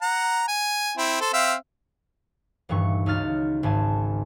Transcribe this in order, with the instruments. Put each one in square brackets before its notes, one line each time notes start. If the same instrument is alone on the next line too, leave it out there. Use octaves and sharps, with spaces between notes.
[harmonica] F#5 A#5
G#5
C4 E4
A4 C5
C4 E5 F5
[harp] D#1 G2 E3 C#6
C#2 D#4 F#4 F6 A6
G#1 G#2 G#5 A5